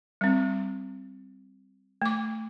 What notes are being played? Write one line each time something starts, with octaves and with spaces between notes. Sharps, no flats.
G3 C4
A3 D6